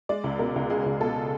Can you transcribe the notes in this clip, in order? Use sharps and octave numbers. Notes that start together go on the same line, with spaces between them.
G#3 D5
C#2
B2 A#4
C#2
G#3 G#4
C#2
B2 A4